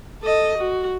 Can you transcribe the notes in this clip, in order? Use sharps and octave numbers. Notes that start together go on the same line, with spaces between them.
A4 D#5
F#4